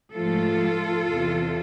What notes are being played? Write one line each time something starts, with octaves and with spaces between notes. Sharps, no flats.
G#2 F3 A3 F4 A4
E2 C3 E3